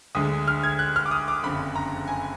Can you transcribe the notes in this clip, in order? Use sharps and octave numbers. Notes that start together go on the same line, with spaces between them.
D2 D3 G#3 D#6
F6
G#6
F#6
F6
D6
D#6
D6
F#1 F2 D3 B5
A#5
G#5